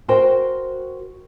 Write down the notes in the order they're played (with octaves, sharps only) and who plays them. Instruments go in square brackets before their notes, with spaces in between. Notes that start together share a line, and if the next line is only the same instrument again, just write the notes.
[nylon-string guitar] F#4 A#4 C5 G5